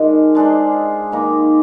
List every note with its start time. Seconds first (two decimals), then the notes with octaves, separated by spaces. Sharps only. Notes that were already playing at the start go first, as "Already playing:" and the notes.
Already playing: D#3 G#3 D4 F4
0.35 G#3 D4 G#4 C5
1.12 D#3 A#3 D#4